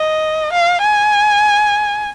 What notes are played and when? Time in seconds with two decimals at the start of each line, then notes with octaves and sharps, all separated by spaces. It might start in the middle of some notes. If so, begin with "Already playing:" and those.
Already playing: D#5
0.52 F5
0.82 G#5